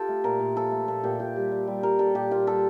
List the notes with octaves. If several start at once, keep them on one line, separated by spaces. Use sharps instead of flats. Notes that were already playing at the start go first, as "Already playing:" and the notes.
Already playing: F4 G4 A4
A3
A#2 A#4
A#2
F3 A4
A3
A#2 A4
A#2 G4
A#2 G4
G3
G3
G3
G3 A#4
G3 A4
A#2 G4
A#2 F4
G3 A4